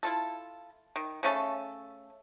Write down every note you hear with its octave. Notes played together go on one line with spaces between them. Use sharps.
E4 F4 A4
D#3
C#3 A3 C#4 A4